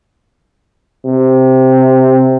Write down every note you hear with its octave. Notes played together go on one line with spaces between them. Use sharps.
C3